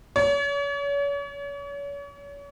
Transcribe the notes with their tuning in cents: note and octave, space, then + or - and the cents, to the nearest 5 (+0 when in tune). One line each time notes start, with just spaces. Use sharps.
C#5 +40